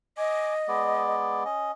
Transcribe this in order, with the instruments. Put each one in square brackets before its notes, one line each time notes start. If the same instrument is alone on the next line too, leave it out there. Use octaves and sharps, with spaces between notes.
[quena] D#5 [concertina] G#5 D6
[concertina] G#3 B3 D5
C#4 D#5